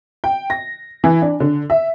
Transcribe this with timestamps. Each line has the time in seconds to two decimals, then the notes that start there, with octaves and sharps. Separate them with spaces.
0.24 G5
0.50 A#6
1.04 E3
1.22 D4
1.40 D3
1.70 E5